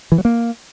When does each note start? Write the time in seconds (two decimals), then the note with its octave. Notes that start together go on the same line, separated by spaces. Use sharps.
0.12 E3
0.18 F#3
0.25 A#3